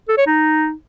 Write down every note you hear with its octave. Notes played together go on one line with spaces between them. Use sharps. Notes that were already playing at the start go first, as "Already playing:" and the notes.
A4
C#5
D#4